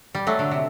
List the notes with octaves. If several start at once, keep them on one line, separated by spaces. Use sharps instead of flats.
G3
F#3 A3
D3
C3